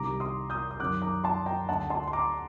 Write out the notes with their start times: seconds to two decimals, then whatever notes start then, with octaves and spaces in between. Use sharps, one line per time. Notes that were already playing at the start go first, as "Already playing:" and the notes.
Already playing: C2 C3 D#3 A#5 D6
0.20 C6 D#6
0.50 D#6 G6
0.71 D#6
0.80 F#2 D#3 D6 F#6
1.02 A#5 D6
1.24 A5 C6
1.46 G5 A#5
1.69 D2 D3 F#5 A5
1.90 A5 C6
2.07 C6
2.13 A#5 D6